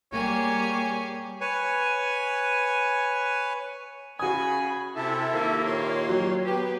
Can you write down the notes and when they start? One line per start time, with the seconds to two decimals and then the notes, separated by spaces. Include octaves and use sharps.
0.12 G3 A#3 G4 G#4 C#5 G#5
1.41 B4 C#5 G#5
4.19 C#3 F#4 G#5 B5 D#6
4.96 C3 E4 A4 E5 A5
5.33 D#3 A#3 F4 G4
5.66 A#2 C#5 C6
6.09 F#3
6.45 B3 G4 B4